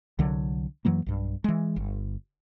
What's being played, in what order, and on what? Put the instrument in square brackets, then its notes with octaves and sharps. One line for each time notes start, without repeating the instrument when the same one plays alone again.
[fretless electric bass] C2 D3 F#3
F#2 E3 F#3 A#3
B1 G2
E3 G#3
G1